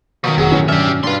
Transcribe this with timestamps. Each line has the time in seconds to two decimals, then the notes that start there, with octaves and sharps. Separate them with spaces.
0.24 B2 D#3 F3 F#3 D#6
0.38 F1 F#3 F#4 G#4
0.52 F#2 A2 E3 C#4
0.68 G2 F#3 C#4 D4 G4 E5 F6
1.03 G2 D4 B4 F5 C6